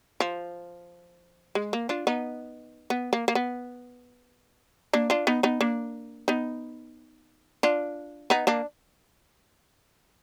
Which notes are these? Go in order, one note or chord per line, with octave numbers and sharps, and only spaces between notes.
F3
G#3
A#3
D4 F4
B3 D#4
B3
A#3
A#3
B3
A#3 D4
D4 F4
B3 D#4
B3 D#4
A#3 D4
B3 D#4
D4 F4
B3 D#4
A#3 D4